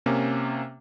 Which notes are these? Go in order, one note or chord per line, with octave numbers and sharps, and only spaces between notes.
C3 A#3 C#4